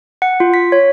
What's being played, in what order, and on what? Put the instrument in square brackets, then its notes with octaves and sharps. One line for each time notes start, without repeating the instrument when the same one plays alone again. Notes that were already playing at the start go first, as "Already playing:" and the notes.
[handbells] F#5
F4
B6
C#5